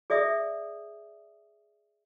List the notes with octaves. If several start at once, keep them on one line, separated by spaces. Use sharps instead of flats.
G#4 D5 E5 D#6